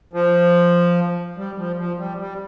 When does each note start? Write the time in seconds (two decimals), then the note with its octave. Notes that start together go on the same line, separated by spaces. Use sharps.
0.13 F3
1.37 G3
1.58 F3
1.78 F3
1.99 G3
2.19 G3